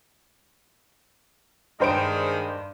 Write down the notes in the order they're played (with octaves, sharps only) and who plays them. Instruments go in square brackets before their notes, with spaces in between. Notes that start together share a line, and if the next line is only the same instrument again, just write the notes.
[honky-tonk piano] G2 C5 D7 [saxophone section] D#3 G#3